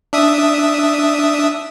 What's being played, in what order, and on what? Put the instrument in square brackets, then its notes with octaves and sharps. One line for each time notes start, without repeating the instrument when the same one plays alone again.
[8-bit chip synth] D4 E5 D#6